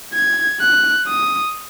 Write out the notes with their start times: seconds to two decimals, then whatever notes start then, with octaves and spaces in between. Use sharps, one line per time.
0.14 G#6
0.61 F#6
1.07 D#6